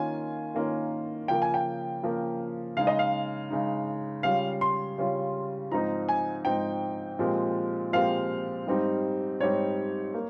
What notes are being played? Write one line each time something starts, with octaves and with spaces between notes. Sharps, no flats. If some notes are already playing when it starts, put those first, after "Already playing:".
Already playing: D#3 A#3 C#4 F4 G#5
D#3 A#3 C#4 F4
C#3 F3 A#3 G5
G#5
G5
C#3 F3 A#3
C#3 G#3 D#4 F5
D#5
F5
C#3 G#3 D#4
C#3 G3 C#4 F4 F5
C6
C#3 G3 C#4 F4
G#2 F3 C4 D#4 A#5
G#5
G#2 F3 C4 D#4 G5
A#2 F3 G#3 C4 G4
A#2 F3 G#3 C4 G4 F5
G#2 G3 C4 D#4 G4
G#2 G3 C4 D#4 G4 C#5
A#3